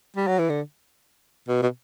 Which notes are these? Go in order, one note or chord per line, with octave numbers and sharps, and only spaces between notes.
G3
F#3
E3
D3
B2
B2